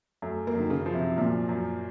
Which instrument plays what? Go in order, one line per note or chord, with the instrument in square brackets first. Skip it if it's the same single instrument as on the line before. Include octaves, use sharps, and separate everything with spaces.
[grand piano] F#2 [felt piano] A3
[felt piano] A#3
[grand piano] F#2 [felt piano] D#3
[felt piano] C#3
[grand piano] F3
[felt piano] C3
[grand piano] F#2 [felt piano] A#2
[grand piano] F#2